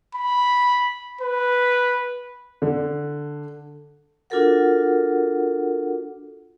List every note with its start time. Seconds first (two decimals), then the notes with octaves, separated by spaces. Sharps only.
0.15 B5
1.21 B4
2.62 D3
4.30 D4 F4 F#4 A4 A#4 F#5